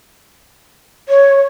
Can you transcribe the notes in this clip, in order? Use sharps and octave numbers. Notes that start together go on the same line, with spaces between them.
C#5